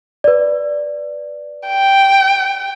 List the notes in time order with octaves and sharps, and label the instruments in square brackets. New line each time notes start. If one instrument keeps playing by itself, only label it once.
[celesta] B4 D5
[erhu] G5